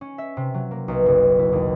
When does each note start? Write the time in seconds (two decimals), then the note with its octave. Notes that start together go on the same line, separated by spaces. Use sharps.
0.01 C#4
0.18 E5
0.37 C3
0.54 F#3
0.71 A#3
0.88 B1
1.06 F#1
1.39 E4
1.53 D#2